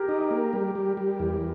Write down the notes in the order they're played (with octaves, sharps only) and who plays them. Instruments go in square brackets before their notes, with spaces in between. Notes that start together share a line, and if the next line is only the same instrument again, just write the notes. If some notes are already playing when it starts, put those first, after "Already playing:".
Already playing: [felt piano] G4 G#4 A#4
[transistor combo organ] D#4
A#3
G3
G3
G3
E2